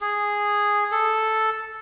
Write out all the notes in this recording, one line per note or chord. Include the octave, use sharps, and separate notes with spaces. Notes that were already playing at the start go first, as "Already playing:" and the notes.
G#4
A4